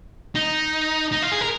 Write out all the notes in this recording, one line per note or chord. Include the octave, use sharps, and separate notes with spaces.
D#4
D#4
F4
G#4
A#4